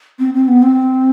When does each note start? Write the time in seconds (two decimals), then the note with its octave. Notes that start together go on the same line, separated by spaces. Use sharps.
0.19 C4
0.34 C4
0.48 B3
0.62 C4